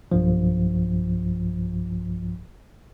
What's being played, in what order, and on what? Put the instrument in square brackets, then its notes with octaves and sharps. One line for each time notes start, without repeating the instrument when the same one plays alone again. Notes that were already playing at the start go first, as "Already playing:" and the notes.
[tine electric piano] B1 G2 F3